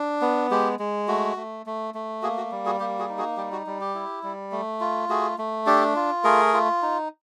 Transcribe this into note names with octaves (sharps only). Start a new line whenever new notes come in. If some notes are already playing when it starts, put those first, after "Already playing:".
Already playing: D4
B3
G#3 G4
G#3
A3 F#4
A3
A3
A3
A#3 F#4 G#4
F#4
G3
F#4 G#4
A#3 G4
F#4 G#4
D#4
F#4 G#4
G3 G4
F#4
G3
G4
E4
G3
A3
F4
A3 F#4 G#4
A3
D4 G4 A4
F4
A3 G#4 A#4
F4
D#4